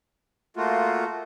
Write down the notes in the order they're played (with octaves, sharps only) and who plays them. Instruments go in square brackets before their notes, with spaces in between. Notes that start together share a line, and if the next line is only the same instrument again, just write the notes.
[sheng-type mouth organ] A3 A#3 F#4 [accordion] F4